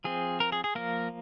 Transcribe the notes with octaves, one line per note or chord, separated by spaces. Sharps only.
F3 C4 G#4
A#4
G#4
G#4
F3 A#3 A#4